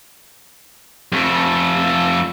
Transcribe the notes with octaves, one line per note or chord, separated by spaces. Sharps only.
F2 A3